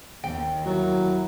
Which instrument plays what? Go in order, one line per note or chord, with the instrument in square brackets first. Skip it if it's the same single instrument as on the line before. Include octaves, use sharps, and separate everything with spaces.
[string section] D#2 [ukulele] G5
[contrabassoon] F#3 [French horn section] E4 F#4 A#4